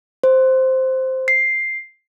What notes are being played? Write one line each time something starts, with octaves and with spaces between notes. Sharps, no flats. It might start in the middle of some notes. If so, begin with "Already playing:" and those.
C5
C7